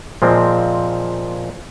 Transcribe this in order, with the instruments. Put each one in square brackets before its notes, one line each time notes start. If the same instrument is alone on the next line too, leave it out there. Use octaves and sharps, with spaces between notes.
[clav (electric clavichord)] A#2 F3 G#3 C4